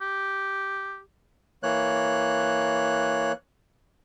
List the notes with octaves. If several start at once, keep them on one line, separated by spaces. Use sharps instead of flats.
G4
E3 A#3 C#5 F#6